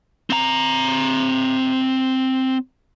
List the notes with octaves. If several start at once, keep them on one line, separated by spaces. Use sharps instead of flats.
C4 A#5